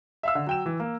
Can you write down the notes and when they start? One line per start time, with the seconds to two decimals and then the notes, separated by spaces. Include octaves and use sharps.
0.23 E5 F5 E6
0.35 D3
0.47 F#3 G5 E7
0.66 E3
0.80 A#3